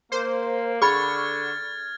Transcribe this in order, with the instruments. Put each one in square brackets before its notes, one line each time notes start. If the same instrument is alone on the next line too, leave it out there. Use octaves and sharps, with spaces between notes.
[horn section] A#3 [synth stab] C5
[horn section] D3 [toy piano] G#4 B5 [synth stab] C#6 [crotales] F6 G#6 A6